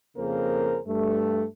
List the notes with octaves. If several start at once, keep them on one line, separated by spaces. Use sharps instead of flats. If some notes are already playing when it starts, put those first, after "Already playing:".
F2 C#3 A#3 G#4 A#4 C5
G2 A3